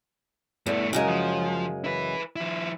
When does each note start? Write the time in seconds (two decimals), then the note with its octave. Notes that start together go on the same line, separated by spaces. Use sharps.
0.66 E2 G2 A3
0.93 F#2 C#3 G#3 A#4
1.08 F3
1.84 E4 B4
2.36 F3 E4